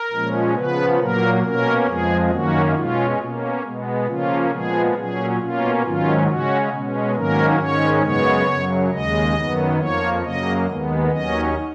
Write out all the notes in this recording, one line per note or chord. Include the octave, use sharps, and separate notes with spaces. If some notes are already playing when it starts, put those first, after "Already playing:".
Already playing: A#4
A#2 F3 G#3 C#4
C#3 F3 B3 B4
A#2 F#3 A#3 A#4
B2 A#3 C#4 A#4
F2 F3 G#3 G#4
F#2 D#3 A#3 C#4 F#4
B2 G#3 C#4 F4
B2 A#3 C#4
B2 G#3 B3
C#3 F3 A#3 C#4 F4
A#2 F3 G#3 B3 G#4
A#2 F#3 C#4 G#4
B2 A#3 C#4 F4
G#2 D#3 F#3 C#4 F4
C#3 G#3 C#4 F#4
B2 G#3 C#4
G#2 D#3 F#3 A#3 C#4 A#4
G#2 D#3 G#3 C#4 C#5
F#2 C#3 G#3 B3 C#5
F#2 C#3 F#3
D#2 C#3 G#3 D#5
F#2 D#3 F#3 B3
F2 F3 A#3 C#5
F#2 C#3 F#3 A#3 D#5
D#2 D#3 G#3 B3
D#2 D#3 F#3 C#4 D#5